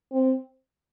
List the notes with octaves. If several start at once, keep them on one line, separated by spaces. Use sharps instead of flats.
C4